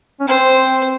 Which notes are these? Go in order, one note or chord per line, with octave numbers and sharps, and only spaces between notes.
C#4
C4 C5